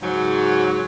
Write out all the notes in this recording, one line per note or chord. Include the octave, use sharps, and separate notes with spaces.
G#2 C#3 F#3